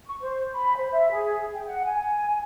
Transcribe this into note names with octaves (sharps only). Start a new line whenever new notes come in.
C#6
C5
B5
C5
E5
G#4
G5
F#5
G#5